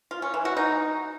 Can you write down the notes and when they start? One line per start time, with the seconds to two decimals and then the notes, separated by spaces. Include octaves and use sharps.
0.11 F4
0.22 C#4
0.34 E3
0.45 F#4
0.57 D#4